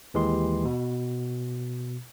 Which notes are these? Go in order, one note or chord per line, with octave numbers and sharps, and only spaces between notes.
D#2 E3 G#3 G4 C6
B2